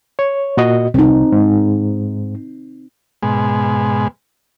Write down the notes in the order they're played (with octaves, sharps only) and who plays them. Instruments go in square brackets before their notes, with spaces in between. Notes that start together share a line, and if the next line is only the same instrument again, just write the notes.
[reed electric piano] C#5
A#2 F#4 D#5
[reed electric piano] C2 [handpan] C4 D#4
[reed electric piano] G#2
[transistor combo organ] G#2 B2 G#3